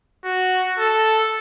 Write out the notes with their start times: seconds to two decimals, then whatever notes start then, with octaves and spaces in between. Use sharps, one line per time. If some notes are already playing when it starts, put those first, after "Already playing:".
0.25 F#4
0.79 A4